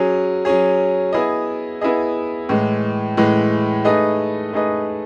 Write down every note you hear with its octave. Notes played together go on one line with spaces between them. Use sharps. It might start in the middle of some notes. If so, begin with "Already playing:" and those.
Already playing: F#3 C#4 G#4
F#3 C#4 G#4
B3 E4 G#4 D#5
B3 E4 G#4 D#5
A2 E3 G#3
A2 E3 G#3
A3 D#4 G#4 B4 D#5
A3 D#4 G#4 B4 D#5